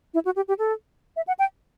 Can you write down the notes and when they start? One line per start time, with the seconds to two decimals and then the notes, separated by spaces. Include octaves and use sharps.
0.14 E4
0.25 F#4
0.36 G4
0.48 G4
0.59 A4
1.16 E5
1.27 F#5
1.39 G5